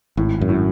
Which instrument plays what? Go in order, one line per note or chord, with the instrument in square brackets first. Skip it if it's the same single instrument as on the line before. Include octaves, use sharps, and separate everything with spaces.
[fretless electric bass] G#1 [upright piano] A2
[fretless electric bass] F#2
[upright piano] A2